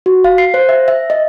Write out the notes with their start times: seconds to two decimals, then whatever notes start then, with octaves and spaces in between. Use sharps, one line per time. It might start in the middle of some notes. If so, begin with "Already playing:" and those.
0.06 F#4
0.24 F5
0.38 C7
0.54 C5
0.69 E5
0.88 E5
1.10 D#5